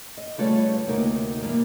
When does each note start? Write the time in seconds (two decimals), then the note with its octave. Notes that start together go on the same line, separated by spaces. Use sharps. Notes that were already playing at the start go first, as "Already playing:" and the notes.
0.17 D#5
0.38 C#3 G3 A3 F4 B4 C#5
0.86 D2 C3 A#3 D#4 A#4
1.42 C3 E3 F#3 G3 A#3